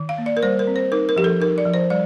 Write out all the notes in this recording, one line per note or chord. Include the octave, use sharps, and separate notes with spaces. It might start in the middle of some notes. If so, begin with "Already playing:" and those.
Already playing: D#3
F5
A#3
D5
A#4
G3 C5
A#4
C4
C5
D#4 A#4
A#4
F3 G4
A4
D#4 A#4
D5
F3
C5
G3 D5